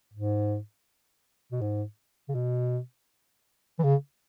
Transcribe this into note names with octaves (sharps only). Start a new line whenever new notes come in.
G#2
B2
G#2
C#3
B2
E3
C#3